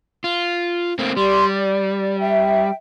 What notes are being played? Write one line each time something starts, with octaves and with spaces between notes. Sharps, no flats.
F4
A3 A#3 C4
G3 G4 D5 C6
D5
E5 G5